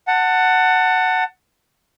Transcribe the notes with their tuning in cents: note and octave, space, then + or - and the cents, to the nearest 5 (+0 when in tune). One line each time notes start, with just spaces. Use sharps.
F#5 +5 A5 +20